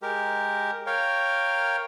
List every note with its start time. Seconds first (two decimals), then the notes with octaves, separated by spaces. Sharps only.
0.02 G#3 G4 A#4
0.87 A#4 C#5 F5 G5